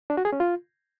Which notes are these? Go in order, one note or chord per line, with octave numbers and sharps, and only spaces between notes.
D4
F#4
G#4
C#4
F4